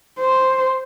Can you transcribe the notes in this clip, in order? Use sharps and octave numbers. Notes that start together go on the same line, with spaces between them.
C5